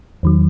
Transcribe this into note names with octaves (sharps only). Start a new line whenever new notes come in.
E2 D#3 F#3